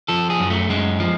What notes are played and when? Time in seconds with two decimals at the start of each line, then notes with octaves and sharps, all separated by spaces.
0.08 F3 A4
0.30 G#4
0.40 F#2
0.50 A3
0.69 F#2 G#3
1.00 F3